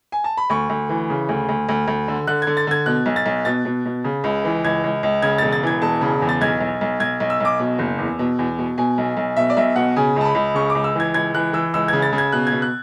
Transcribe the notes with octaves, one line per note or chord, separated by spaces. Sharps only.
G#5
A5
B5
D2 C#6
D2
E3
C#3
D2
D2
D2
D2
D3
D3 F#6
D3 G#6
A6
D3 G#6
B2 F#6
B1
A6
B1
B2 A6
B2
B2
C#3
C#2
E3
C#2 G#6
C#2
C#2
C#3 G#6
E1 A6
A6
E3 G#6
E1 A5
C#3
E2
A6
B1 G#6
B1
B1
B1 G#6
B1
E6
B1 D6
B2
F#1
E2
B2
E2
B2
B2 G#5
B1
B1
B2 E5
D5
B1 E5
B2 F#5
C#3 G#5
C#2 A5
B5
C#2
C#3 C#6
D6
C#2
E6
E3 G#6
C#2 G#6
E3 F#6
E3 E6
C#2 E6
C#3 G#6
A6
C#3
G#6
B2 F#6
G#6
B2
F#6